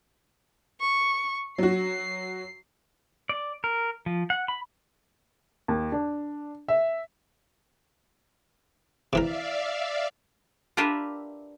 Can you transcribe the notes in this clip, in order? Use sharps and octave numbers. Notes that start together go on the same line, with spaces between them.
C#6
F#3 F#4 C7
D5
A#4
F3
F#5
B5
D#2
D4
E5
C3 E3 A#4 D5 E5 F5
D4 F4 G4 A#4 B4 E5